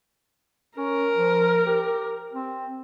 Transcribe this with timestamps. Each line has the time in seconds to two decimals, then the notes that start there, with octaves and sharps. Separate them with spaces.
0.77 C#4 A#4
1.17 F3
1.66 G4
2.33 C4